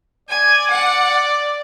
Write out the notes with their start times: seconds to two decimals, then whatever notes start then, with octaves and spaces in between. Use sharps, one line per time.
0.28 D5 G#5
0.71 F#5